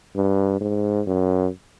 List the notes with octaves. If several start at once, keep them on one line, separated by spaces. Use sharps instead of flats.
G2
G#2
F#2